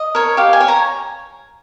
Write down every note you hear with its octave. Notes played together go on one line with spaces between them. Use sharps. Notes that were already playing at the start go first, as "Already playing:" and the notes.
Already playing: D#5
A#4 C#5
G4 F5
G#5
C#5
A#5